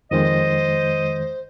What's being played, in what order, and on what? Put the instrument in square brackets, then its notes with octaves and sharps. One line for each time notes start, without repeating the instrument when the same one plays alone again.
[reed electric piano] F2 D#3 G#3 [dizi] C5 [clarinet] D#5